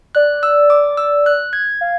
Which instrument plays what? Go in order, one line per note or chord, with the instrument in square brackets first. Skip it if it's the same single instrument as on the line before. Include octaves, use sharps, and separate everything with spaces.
[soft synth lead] D5 [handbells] F#6
[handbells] E6
D6
E6
F#6
G#6
[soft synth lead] F5